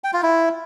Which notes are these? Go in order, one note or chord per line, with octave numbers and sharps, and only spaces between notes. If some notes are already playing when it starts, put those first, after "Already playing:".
G5
F4
E4